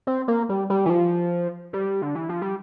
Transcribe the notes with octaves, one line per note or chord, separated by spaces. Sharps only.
C4
A#3
G3
G3
E3
F3
G3
D3
E3
F3
G3